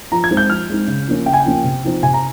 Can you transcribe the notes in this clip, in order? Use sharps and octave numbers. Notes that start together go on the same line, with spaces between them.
F3 A#5
G#6
G#3 C4 D#4
G6
F3 F6
G#3 C4 D#4
C#3
F3 A#3 C#4
C#3 G5
G#5
G5
F3 A#3 C#4
C3
F3 C4 D#4
C3 G#5
A#5